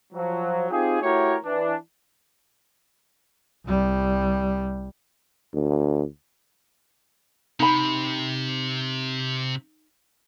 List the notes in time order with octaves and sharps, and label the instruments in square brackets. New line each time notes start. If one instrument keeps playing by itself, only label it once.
[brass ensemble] F3 F#3
C4 D#4 F4 G4 G#4
A3 E4 F#4 G4 A#4 C#5
E3 D4
[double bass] C2 G3
[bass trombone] D2
[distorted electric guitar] C3 [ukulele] D#4 B5